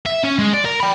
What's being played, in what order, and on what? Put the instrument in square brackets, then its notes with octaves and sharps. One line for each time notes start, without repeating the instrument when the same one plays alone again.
[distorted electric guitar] E5
C#4
G#3
D5
A#4
G5 B5